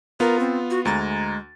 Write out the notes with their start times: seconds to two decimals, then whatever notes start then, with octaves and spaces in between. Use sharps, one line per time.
0.20 B3 F4 A#4
0.40 C4
0.71 F#4
0.85 D2 G#3 A#5 A6